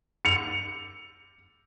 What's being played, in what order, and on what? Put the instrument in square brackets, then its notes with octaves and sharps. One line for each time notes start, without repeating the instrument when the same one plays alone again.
[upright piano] C#7 F7